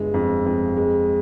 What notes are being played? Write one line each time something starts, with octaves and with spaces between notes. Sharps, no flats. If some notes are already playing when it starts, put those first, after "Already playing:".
Already playing: G1 G2 G#3
F2
F2
G#3